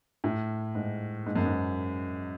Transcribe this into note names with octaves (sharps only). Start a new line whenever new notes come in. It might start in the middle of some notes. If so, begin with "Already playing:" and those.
A2
G#2
G#2
F#2
G#2